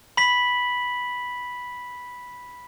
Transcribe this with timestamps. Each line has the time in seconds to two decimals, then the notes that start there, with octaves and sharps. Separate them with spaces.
0.17 B5 B6 F#7